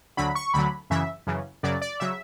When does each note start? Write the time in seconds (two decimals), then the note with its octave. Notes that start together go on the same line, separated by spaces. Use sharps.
0.17 D2 D3 F#3 B5
0.35 C#6
0.54 D2 D3 F#3 B5
0.90 F#2 C#3 E3 E5
1.27 F#2 C#3 E3
1.63 F#2 C#3 F#3 D5
1.82 D5
2.00 C#3 F#3 E5